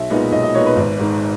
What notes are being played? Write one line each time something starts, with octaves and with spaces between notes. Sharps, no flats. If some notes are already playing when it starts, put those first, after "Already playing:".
Already playing: B1 E5
A#2 G#3 B3 D#4
B1 D#5
D#5
A#2 G#3 B3 D#4 C#5
B4
G#1
G#2 D#3